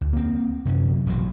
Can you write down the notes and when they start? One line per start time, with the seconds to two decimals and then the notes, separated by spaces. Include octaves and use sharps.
0.01 D2
0.13 A#3 C4
0.65 F#2 C3 F#3 C#4
1.06 A1 B2 D3 F#3